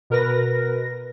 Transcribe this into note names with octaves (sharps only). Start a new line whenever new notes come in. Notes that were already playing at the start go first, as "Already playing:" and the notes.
B2 A#4 B4 A#6